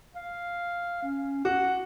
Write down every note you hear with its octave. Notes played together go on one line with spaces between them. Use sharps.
F5
C#4
F#4 F#5